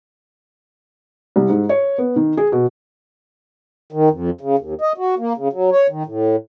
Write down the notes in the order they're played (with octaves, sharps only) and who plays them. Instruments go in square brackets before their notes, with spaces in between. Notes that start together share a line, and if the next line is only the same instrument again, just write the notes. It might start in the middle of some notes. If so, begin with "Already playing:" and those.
[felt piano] C2
G#2
C#5
B3
D#3
G#4
B2
[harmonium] D#3
F2
C#3
D#2
D#5
F#4
A#3
C#3
F#3
C#5
D#3
A2